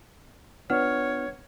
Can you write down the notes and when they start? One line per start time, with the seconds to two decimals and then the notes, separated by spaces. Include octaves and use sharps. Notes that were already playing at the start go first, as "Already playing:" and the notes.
0.70 B3 D4 F4 B4 C#5 F#5 F6